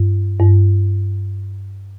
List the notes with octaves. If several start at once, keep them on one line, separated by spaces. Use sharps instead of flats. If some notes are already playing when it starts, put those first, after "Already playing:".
Already playing: G2
G2